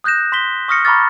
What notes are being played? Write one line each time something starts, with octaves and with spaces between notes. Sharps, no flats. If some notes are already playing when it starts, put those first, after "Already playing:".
D#6 F#6 G6 A#6 E7
C6 B6 G7
C#6 D#6 F6 A#6 C#7
A#5 B5 C#6 D6 F6 A6